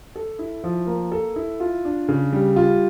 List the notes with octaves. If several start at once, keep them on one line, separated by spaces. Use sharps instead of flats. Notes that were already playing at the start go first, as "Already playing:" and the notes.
A4
E4
F3
A#3
A4
E4
F4
D4
C#3
G3
F4